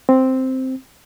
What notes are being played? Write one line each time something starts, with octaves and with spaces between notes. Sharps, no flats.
C4